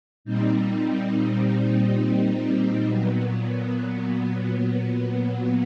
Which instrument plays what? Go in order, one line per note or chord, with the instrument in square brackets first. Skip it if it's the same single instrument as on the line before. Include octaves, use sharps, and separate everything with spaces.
[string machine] A#2 G3 C4 D#4
A#2 F#3 B3